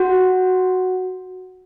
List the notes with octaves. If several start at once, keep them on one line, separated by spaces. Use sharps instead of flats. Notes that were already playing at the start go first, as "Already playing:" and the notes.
Already playing: F#4